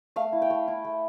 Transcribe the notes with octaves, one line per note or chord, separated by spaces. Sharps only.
A3 F5
E4
G5
A3
E4
A3